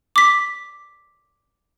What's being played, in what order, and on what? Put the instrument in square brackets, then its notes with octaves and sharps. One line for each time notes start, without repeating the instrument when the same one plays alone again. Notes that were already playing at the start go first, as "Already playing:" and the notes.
[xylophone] D6 B6